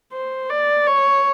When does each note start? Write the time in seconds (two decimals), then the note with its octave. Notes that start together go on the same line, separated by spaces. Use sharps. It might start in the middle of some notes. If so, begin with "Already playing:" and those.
0.13 C5
0.50 D5
0.87 C#5